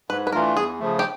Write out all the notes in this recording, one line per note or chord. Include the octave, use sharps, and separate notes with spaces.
G#2 B4
B4
E3 A3 D4 F4 A#4
E2 G#4
C#3 F3 A3
G4